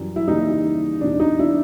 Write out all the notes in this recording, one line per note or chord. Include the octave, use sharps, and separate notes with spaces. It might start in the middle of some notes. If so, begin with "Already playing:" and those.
Already playing: F#2 E3 G3
E4
D#2 C#3 E3 G3 D#4
E2 C3 E3 G3 D4
D#4
D4 E4